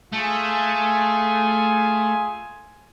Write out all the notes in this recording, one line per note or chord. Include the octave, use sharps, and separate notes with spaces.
A3 F4 G#4 G#5